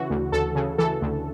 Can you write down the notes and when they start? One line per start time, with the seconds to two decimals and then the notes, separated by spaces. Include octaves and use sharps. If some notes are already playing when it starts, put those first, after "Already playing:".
Already playing: C#3 E3 F#4
0.10 D2
0.32 D2 A4
0.55 C#3
0.78 E3 A4
1.02 D2